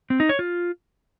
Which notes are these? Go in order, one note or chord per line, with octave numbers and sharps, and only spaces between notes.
C4
D#4
C#5
F4